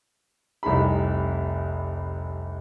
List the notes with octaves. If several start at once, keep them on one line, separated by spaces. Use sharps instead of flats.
F1 C2 D#4 G#4 B5